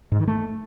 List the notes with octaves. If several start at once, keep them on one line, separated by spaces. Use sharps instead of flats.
G#2
D#3
A3